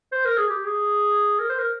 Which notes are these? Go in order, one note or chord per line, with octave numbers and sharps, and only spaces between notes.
C5
A#4
G#4
G4
G#4
A#4
C5
A#4